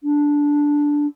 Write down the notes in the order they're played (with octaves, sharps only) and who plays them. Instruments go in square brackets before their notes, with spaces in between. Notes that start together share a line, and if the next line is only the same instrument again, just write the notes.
[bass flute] D4